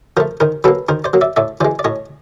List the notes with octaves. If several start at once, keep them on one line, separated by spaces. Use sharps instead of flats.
F3 A3 A#4 C5
D#3 A#4 C5
F#3 A#3 A4 B4
D#3 A#4 C5
C5 D5
F#3 A#3
D5 E5
A2 D5 E5
E3 G#3 C5 D5
D5
A2 C#5 D#5